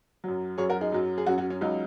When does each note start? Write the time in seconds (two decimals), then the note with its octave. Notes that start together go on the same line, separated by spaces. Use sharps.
0.24 F#2 F#3
0.58 F#2 F#3 G#4 C#5
0.70 F#4 A#4
0.81 D#4 G#4
0.92 F#2 F#3
1.18 G#4
1.27 F#2 F#3 C#4 F#4
1.38 C#4 F#4
1.50 C#4
1.61 C#2 C#3 F#3 D#4